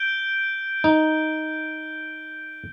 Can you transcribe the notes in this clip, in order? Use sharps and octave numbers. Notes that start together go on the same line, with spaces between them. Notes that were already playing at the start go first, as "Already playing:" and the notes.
Already playing: G6 D7 G7
D#4